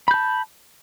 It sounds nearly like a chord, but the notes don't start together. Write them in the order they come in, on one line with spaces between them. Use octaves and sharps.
B5 G6 A5